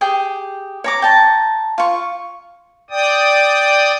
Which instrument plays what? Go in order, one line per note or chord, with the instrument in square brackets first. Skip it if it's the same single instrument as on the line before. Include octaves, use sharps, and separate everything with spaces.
[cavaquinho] G4 G#4 G5
C#5 A#5 D6
G5 A5 A#5
F4 C#6
[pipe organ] D5 G5 D#6